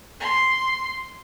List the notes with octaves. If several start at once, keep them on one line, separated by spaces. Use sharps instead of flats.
C6